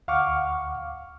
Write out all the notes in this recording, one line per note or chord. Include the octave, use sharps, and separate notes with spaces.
D2 F5 F#5 C#6 D6 F6